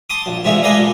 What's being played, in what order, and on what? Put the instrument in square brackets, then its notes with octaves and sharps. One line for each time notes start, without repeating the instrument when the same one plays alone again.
[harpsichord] A5 C6 D6 D#6
A#1
C3 E3 G#3 A3 D4 F4
G#4 A4 B4 D5 D#5 F5
A#2